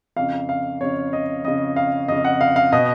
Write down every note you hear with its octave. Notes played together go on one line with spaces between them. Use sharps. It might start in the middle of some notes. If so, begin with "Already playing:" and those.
F2 C#3 F5
F5
F2 C#3 C#5
D#5
F2 C#3 D#5
F5
F2 C#3 D#5
F#5
F5
F5
B2 D#5